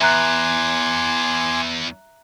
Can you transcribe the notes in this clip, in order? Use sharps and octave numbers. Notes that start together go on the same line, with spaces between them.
E2 E5 G#5 A#5 C6 D6 F#6